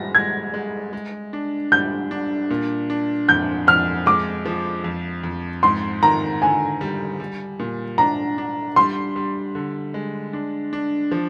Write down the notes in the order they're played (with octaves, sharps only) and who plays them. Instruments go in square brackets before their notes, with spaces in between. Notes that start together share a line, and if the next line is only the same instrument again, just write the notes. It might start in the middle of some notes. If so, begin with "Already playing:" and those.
Already playing: [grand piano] G3 [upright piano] A#6
[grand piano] G#3 [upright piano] G#6
[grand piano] G#3
G#3
D4
[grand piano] G3 [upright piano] G6
[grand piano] D4
A#2
D4
[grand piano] F2 [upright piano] G6
[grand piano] F2 [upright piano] F6
[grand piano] G#3 [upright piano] D6
[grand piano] F3
F2
F2
[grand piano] G#2 [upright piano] C6
[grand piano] D#3 [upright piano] A#5
[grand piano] D3 [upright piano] G#5
[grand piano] G3
G3
A#2
[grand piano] D4 [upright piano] A#5
[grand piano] D4
[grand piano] G3 [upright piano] C6
[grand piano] G3
D3
G#3
D4
D4
F3